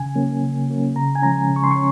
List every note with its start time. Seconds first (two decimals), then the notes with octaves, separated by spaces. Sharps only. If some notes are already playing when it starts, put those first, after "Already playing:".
Already playing: C#3 G#5
0.15 F#3 A#3 C#4
0.43 C#3
0.69 F#3 A#3 C#4
0.96 C#3 A#5
1.15 G#5
1.22 F3 G#3 C#4 A#5
1.49 C#3
1.56 C#6
1.64 C6
1.71 C#4 C#6